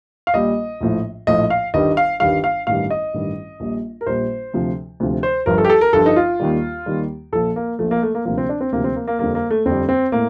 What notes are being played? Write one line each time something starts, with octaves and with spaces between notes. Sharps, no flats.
F5
A#1 A#2 G3 D#5
A#1 A2 F3
A#1 A2 F3 D#5
F5
G1 G2 D#3 G3 D#5
F5
G1 G2 D#3 G3 F5
F5
A1 G2 D#3 G3 F5
D#5
A1 G2 D#3 G3
A#1 A#2 G3
A#4
A#1 A#2 G3 C5
D2 C3 F3
D2 C3 F3
C5
G1 G2 F3 A#4
A4
G4
A4
A#4
G1 G2 F3 A4
D#4
F4
D#2 D#3 G3
D#2 D#3 G3
A#1 A#2 F3 A4
A#3
A#1 A#2 F3 A3
A#3
A3
A#3
D2 C3 F3 A#3
C4
D4
C4
D2 C3 F3 A#3
C4
A#3
A#3
F2 D3 G3 A#3
A#3
A3
F2 D3 G3 C4
C4
A2 A#3